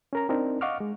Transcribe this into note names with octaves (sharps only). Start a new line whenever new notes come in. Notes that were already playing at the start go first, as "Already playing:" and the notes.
C#4 A#4 A#5
C4 D4 D#4 A#4
D#5 F5 F#5 C#6 D6 F6
G#3